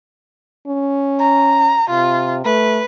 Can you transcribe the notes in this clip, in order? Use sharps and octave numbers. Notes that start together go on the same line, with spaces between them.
C#4
A#5
C3 F4
A3 B4